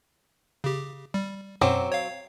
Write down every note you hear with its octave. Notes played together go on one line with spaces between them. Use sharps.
C#3 G4
G3
F#2 B2 F#3 C4 D6
C#5 F5